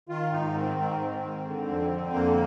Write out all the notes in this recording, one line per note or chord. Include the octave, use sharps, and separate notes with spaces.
D#3 F4
G#2 D#4
D#3 C4
G#2 C4
D#3
G#2
D3
F2
D3
F2 A#3